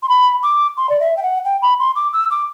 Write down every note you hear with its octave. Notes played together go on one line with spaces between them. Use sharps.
C6
B5
D6
C6
D5
E5
G5
F#5
G5
B5
C6
D6
E6
D6